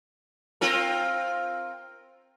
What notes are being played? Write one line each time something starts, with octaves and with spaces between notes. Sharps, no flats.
C4 F4 A#4